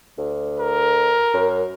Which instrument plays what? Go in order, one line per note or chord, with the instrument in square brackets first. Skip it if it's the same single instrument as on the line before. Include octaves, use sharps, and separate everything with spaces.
[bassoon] D2
[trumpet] A#4
[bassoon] F#2